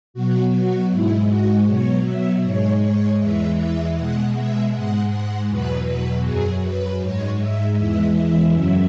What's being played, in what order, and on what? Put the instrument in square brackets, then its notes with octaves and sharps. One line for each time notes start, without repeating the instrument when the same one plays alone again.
[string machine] B2 F#3 F#4
F#4
G#2 G#3 E4
F#4
B2 F#3 C#5
E5
G#2 G#3 C#5
C#5
E2 E3 G#3 E5
E5
B2 G#3 F#5
E5
G#2 G#3 F#5
F#5
E2 B2 F#3 B4
B4
F#2 F#3 G#4
B4
G#2 G#3 C#5
E5
E2 E3 G#3 E5
E5
F#2 C#3 F#3 E5